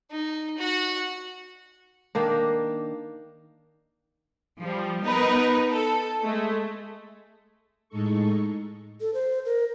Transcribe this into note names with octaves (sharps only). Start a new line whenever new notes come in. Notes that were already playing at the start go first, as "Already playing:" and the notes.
D#4
F#4 F#5
D#3 A#3 D4
F3 G3
B3 D#4 A#4 B4
A4
G#3 A3
A2 G#3 D#4 A4 C#6
A4
C5
A#4